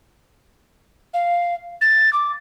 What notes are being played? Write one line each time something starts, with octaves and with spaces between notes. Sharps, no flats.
F5
A6
D6